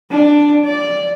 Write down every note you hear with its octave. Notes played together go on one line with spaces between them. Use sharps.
D4
D5